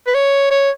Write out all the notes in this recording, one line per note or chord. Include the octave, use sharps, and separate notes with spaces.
B4
C#5
C#5